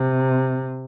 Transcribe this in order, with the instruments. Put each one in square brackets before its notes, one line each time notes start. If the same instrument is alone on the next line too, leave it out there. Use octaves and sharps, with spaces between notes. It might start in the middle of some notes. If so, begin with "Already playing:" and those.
Already playing: [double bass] C3